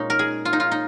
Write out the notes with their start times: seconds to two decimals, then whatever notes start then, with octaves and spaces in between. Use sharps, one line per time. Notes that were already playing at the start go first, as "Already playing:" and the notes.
Already playing: A#2 G#3 C#4 D#4
0.10 A#4
0.19 G#4
0.45 F4
0.53 D#4
0.60 F4
0.71 D#4